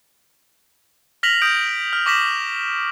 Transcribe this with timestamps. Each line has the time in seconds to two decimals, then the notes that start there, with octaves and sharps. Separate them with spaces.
1.23 F6 A#6 B6 F7 F#7
1.42 D#6 G6 D7
1.93 F6
2.06 C#6 D6 A#6 B6 E7 F#7